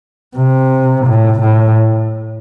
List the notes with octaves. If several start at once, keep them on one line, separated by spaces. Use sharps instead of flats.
C3
A2
A2